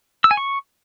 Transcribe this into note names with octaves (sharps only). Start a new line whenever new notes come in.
E6
G#5
C#6